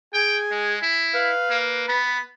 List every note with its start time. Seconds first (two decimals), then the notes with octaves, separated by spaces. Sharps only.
0.14 G#4 G5 G#5
0.51 G#3
0.82 E4
1.14 B4 F5
1.50 A#3
1.88 B3 B5